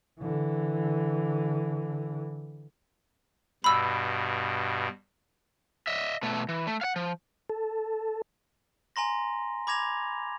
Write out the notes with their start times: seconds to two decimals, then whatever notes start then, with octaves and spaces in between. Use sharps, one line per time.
0.20 D3 E3
3.64 G2 B2 B5 E6
5.87 D#5 E5
6.23 B2 A3
6.49 E3
6.67 A3
6.81 F5 F#5
6.96 F3
7.50 A4
8.96 G#5 A#5 C6 A#6
9.67 B5 D6 G#6 A#6 F7